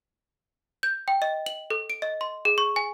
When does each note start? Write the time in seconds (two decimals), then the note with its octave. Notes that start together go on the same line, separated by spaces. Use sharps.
0.83 G6
1.08 G5
1.22 D#5
1.46 F#7
1.70 A4
1.90 D7
2.02 D#5
2.21 C6
2.45 G#4
2.58 C#6
2.76 G#5